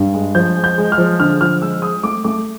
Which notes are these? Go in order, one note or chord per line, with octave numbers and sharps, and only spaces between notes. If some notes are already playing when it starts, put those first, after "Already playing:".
Already playing: G2
G#3
F3 G6
G#3
G6
G#3
F6
F3
D3 F6
F3 F6
G#3 E6
G#3 D#6
A3 D6
A3 D6